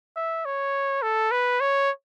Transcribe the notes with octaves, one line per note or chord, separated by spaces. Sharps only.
E5
C#5
A4
B4
C#5